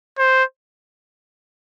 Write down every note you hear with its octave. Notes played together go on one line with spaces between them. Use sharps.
C5